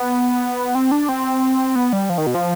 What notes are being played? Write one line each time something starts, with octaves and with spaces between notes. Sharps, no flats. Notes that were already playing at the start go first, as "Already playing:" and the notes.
Already playing: B3
C4
D4
C4
B3
G3
F3
D#3
B2
F3